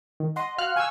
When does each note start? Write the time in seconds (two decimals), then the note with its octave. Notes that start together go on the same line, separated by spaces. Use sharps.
0.20 D#3
0.36 D#5 F#5 C6
0.58 F#4 F5 F6 F#6
0.76 G#5 C#6 E6